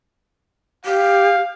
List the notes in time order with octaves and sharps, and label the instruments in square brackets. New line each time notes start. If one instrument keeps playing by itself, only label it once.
[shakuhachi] G4 [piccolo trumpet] F5